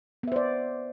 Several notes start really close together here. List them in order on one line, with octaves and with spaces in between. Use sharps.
B3 E5 C5 D5